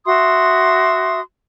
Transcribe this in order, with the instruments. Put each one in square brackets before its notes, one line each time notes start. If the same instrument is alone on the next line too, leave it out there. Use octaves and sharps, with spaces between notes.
[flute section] F#4 E5 C6 D#6